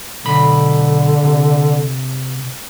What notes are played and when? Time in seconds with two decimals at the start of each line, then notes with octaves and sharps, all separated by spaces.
0.25 B1 D3 B5
1.23 C3